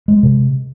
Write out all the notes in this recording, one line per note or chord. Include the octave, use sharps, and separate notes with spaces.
G#3
C3